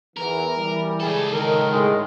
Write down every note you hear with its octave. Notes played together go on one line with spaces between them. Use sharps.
E2 E3 A#4
E3 G3
C#2 G#4 A4
D#3 A#4
A2 D#3 G#3